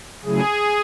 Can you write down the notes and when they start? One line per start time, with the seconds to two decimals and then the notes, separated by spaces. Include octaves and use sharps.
0.25 C#3 F#3 A3 E4 G#4